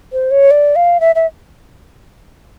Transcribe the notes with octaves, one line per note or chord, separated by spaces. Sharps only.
C5
C#5
D5
F5
E5
E5